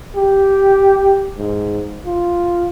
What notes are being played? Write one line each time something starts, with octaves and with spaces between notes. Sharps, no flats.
G4
G#2
F4